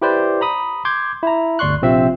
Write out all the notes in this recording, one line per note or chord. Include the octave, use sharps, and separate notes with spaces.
E4 G4 B4 C5 D5
A#5 B5 D#6
C6 D6 G6 G#6
E4 A#5
G1 D2 D5 C6 C#6 F#6
A#1 C3 C4 F4 E5